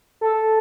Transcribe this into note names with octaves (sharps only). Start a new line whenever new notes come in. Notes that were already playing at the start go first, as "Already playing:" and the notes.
A4